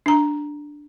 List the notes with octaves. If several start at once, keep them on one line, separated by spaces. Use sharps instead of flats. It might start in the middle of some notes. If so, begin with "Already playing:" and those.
D4 A#5